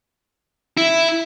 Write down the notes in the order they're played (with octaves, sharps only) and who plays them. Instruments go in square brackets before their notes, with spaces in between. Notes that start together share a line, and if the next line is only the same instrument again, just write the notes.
[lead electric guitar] E4